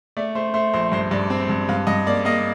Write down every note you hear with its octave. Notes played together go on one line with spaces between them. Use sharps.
A3 D5
A3 C5
A3 C5
A#1 C5
G2 C5
G2 D5
C4
G2
G2 F5
G2 D#5
A#3 D5
A#3 D#5